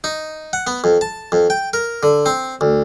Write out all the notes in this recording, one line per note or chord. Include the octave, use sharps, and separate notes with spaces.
D#4
F#5
B3
F2
A5
F2
G5
A#4
D3
C4
D2